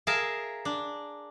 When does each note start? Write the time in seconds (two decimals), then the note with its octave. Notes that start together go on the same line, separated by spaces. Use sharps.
0.07 G#4 A#4 E5 F5 A5
0.65 D4